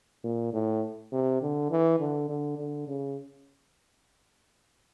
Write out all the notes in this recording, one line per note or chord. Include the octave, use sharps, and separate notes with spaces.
A#2
A2
C3
D3
E3
D3
D3
D3
C#3